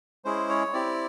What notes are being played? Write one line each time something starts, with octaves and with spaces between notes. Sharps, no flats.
G#3 C#4 E4 G#4 C5
C#5
C4 E4 G4 D5